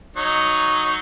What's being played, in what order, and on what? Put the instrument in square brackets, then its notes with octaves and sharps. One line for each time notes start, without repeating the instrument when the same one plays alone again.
[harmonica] F#3 D#4 C#5